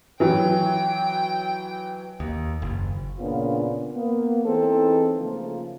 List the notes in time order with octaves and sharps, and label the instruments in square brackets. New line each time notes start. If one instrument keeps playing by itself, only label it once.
[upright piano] E3 F#3 [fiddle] G5
[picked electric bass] D#2
F#1
[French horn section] A#2 C#3 A#3 B3 D4 F4
A#3 B3
E3 C4 D#4 G#4 A4
C#3 F3 A3 A#3